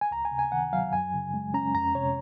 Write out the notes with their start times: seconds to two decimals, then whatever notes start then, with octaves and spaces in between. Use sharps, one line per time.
0.01 G#5
0.11 C#2 A#5
0.25 G#5
0.31 C3
0.39 G#5
0.52 D#3 F#5
0.73 F#3 F5
0.92 F#2 G#5
1.14 C#3
1.34 G#3
1.54 C#4 A#5
1.75 F2 A#5
1.95 C3 C#5